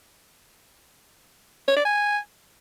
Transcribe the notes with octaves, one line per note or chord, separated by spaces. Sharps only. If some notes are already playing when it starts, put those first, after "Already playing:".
C#5
D5
G#5